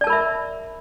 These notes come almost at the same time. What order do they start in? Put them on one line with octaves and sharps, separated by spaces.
D5 A5 A#4 B5 E5